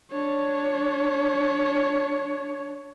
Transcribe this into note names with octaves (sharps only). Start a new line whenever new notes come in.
D4 C#5